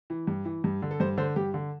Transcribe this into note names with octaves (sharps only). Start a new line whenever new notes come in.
E3
G2
E3
G2
D3
A4
G2 C5
D3 C5
G2 G4
D3